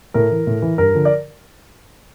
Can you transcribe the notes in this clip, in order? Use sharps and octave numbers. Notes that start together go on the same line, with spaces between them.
A2 A#4
E3
A2
E3
G2 A#4
D3 F3
D5